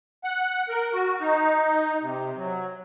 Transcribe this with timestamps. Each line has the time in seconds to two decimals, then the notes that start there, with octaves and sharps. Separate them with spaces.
0.24 F#5
0.69 A#4
0.93 F#4
1.20 D#4
2.02 C3
2.37 F#3